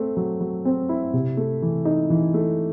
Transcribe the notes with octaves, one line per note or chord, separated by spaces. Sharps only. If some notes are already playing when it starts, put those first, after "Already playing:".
Already playing: A3 C4
F#3
F#3
C4
E4
C3
A3
E3
D#4
E3
A3